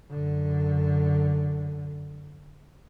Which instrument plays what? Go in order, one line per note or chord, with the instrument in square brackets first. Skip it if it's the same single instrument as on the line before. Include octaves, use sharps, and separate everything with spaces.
[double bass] F#2 D3